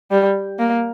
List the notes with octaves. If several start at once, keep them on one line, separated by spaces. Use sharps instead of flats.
G3
A#3